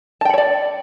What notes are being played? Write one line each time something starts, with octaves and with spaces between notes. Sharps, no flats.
C#5 D5 G5 A5 B5